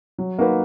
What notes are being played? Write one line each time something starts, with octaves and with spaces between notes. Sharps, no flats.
F#3
A#3 D#4 F#4 B4